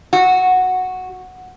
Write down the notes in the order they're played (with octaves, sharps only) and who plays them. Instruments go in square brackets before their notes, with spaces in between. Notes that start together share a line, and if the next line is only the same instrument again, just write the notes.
[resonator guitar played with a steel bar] F#4